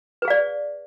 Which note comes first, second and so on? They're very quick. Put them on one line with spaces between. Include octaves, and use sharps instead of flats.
B4 G#4 F5 D5